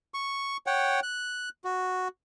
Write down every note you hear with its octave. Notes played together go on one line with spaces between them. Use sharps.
C#6
C#5 F#5 G5
F#6
F#4